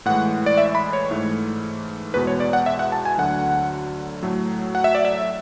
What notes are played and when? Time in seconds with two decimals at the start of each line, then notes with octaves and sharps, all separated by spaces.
0.06 A2 E3 G#3 F#5
0.46 D5
0.58 E5
0.75 B5
0.93 C#5
1.11 G#2 E3 A3
2.14 E2 B2 G#3 B4
2.27 C#5
2.40 D5
2.53 F#5
2.66 E5
2.79 F#5
2.92 A5
3.05 G#5
3.18 D2 D3 F#3 F#5
4.23 A2 F#3 A3
4.75 F#5
4.84 E5
4.95 D5
5.05 E5